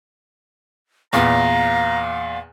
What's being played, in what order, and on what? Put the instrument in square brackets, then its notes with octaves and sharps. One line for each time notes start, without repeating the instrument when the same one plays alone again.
[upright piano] E2 A#2 B3 [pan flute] F5 [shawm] A#5